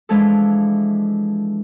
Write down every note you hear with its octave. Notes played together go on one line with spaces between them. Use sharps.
E3 F3 G#3 D4 A4